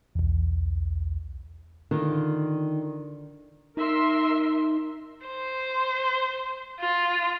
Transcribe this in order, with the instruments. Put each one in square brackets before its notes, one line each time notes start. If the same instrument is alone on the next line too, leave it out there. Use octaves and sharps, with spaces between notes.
[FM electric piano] B1 E2
[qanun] D3 F4 [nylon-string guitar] D#3
[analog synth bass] D#4 [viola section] A#4 E5 C6
[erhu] C5
F4